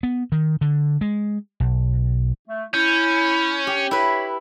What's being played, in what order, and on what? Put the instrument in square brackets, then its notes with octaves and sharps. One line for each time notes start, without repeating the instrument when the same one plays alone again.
[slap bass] B3
D#3
D3
G#3
B1
[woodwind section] A3
[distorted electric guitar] C#4 [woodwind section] E4 [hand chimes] G6
[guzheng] G4
[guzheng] E4 B4 [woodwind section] C#5 B5